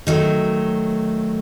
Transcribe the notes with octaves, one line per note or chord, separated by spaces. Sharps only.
D#3 F#3 A3